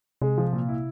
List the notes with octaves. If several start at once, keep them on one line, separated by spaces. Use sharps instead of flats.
C3 G#3
F3
A#2
E4